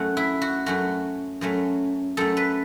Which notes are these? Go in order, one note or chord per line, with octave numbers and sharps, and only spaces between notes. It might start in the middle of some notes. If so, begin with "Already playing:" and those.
Already playing: F#2 F#3 A3 C#4 F#5
E4
F#4
F#2 F#3 A3 C#4 F#4
F#2 F#3 A3 C#4
F#2 F#3 A3 C#4 A4
B4